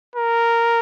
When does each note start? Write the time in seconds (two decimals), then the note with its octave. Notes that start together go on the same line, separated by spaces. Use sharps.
0.15 A#4